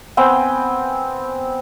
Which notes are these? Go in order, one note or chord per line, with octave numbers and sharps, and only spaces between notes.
B3 C4 G5 G#5